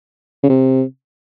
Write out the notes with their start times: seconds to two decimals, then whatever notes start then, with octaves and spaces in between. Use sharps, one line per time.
0.43 C#3
0.49 C3